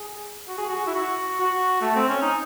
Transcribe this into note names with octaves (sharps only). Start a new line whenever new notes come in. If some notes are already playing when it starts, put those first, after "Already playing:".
Already playing: G#4
F#4
G#4
F#4
E4
F#4
F#4
A3
C4
C#4
D#4